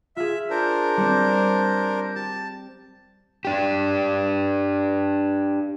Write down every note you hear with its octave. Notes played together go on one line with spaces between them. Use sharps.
F4 G#4 E5
D4 A#4 C5
G3 C4
G4 A5
D4 G4